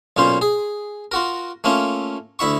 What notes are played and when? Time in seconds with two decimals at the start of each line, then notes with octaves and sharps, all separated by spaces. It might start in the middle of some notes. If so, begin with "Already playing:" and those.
0.17 B1 A#2 C#4 F4 C5
0.41 G#4
1.12 F4 F#4 A#4
1.64 A3 A#3 C#4 F4
2.39 D2 E4 E5 C#6